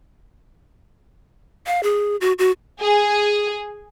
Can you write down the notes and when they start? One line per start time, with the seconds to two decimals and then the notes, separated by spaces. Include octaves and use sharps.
1.67 F5
1.83 G#4
2.21 F#4
2.39 F#4
2.80 G#4